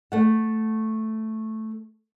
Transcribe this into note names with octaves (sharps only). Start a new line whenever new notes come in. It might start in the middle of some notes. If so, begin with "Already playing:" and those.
A3 F#5